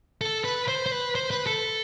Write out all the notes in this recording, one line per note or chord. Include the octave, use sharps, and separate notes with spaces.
A4
B4
C5
C5
B4
C5
B4
A4